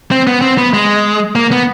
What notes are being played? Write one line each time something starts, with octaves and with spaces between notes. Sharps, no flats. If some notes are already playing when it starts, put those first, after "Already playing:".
C4
B3
C4
B3
G#3
A#3
B3